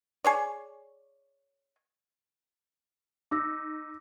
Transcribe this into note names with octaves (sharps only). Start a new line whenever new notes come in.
G#4 C#5 D5
D#4 D6 E6 A#6